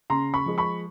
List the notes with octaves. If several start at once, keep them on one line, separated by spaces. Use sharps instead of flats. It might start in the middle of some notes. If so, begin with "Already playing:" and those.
C#3 A#5 C6
B5 C#6
F3 G#3
B5 C#6